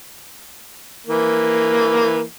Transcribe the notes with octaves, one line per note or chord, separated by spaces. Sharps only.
E3 A#3